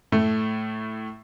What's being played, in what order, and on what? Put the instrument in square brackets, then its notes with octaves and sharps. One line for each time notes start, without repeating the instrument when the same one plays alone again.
[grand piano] A2 A3